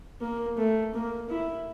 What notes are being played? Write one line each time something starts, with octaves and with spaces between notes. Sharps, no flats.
A#3
A3
A#3
E4